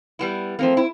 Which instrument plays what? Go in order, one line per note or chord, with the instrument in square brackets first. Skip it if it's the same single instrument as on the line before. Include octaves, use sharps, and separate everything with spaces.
[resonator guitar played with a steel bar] G3 B3 E4
[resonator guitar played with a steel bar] F3 A3 A#3 [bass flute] C4
[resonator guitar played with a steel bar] E4